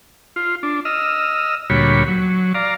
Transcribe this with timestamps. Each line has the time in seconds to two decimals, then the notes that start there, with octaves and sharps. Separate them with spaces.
0.36 F4
0.63 D4
0.85 D#5 E6 F6
1.70 D2 A#2 G3 F#4 C#5 B5
2.08 F#3
2.54 D5 F5 A#5